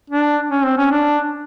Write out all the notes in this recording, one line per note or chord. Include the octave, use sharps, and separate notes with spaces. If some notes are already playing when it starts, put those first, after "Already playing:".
D4
C#4
C4
C#4
D4